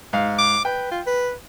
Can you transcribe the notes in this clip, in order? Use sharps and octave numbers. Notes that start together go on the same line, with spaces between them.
G#2 F5
D6
B4 G5
F4
B4